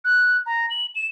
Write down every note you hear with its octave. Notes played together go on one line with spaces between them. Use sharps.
F#6
A#5
F#7
E7